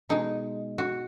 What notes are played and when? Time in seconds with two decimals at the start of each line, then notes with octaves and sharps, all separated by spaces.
0.09 B2 G#3 D#4
0.78 F#4